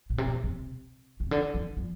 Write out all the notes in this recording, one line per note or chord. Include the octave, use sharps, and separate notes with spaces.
A#2
C3
A#2
C3
C3
D3
D#3
F3